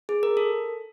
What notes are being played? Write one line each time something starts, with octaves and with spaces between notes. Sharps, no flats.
G#4
A#4
A4